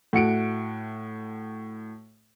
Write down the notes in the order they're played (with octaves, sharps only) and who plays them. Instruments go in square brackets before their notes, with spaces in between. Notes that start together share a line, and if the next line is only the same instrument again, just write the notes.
[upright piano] A2 F#4 C#7 D7